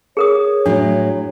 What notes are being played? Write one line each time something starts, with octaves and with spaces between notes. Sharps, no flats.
G#4 A#4 C#5 D#6
A2 F#3 G#3 D4